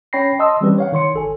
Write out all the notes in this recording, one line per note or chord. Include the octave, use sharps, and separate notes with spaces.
C#4 C#5 G5 B5 A#6 C7
D#5 A5 C6 D#6 E6
E3 G3 C4 C#4 G4 B4
C#5 F5 F#5
D#3 C#5 C6 C#7
G1 A4 G#5